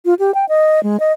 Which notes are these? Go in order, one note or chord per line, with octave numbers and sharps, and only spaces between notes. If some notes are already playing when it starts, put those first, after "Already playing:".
F4
G4
G5
D#5
G#3
D#5